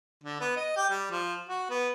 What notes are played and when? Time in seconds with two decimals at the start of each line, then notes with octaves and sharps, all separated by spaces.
0.24 D3
0.41 B3
0.56 D#5
0.76 G4
0.90 G3
1.11 F3
1.49 F#4
1.70 B3